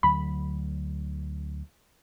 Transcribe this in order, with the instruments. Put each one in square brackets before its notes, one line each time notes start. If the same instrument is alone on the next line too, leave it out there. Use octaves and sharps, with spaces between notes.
[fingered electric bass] D2 D3 F#3 [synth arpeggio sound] B5